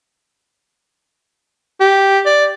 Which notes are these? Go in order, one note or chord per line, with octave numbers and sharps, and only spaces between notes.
G4
D5